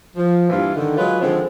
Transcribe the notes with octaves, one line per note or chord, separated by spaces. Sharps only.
F3
G2 A#2 E3 F4
D3 D#3
F#3 G#3 F4 B4 C#5
D3 D#3 F3 G#3 C4